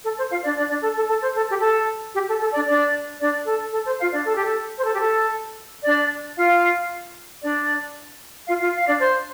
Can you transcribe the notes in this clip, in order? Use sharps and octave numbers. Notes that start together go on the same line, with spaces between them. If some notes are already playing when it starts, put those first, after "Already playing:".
A4
C5
F4 F5
D4 D5
D4 D5
D4 D5
A4
A4
A4
C5
A4
G4
A4
G4
A4
A4
D4 D5
D4 D5
D4 D5
A4
A4
C5
F4 F5
D4 D5
A4
G4
A4
C5
A4
G4
A4
D4 D5
F4 F5
D4 D5
F4 F5
F4 F5
F5
D4 D5
C5